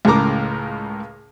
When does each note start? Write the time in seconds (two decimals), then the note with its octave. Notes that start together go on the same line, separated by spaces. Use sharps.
0.05 C#2 A2 C#3 A#4 A#5 D6